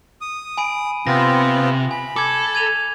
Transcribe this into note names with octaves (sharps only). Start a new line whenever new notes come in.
D#6
G#5 B5 D7
C3 B3 C4 F4 A#6
G#5 B5
A4 D6 G#6
G#6 D#7 F7